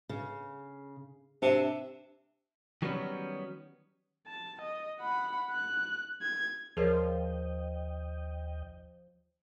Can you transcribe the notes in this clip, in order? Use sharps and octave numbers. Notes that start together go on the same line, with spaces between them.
C#3
C3 D4 E5
D#3 F#3 G3 A#3 B3 C#4
A5
D#5
F#5 B5
F#6
G#6
D#2 F3 G#4 A#4 C#5 D#5 G5